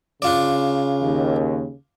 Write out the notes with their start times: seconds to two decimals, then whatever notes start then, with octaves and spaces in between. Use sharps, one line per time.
0.22 C#3 D4 F4 D5
1.02 D#2